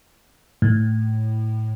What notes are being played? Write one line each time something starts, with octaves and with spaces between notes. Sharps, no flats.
A2